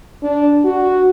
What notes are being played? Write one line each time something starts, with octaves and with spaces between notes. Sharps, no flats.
D4
F#4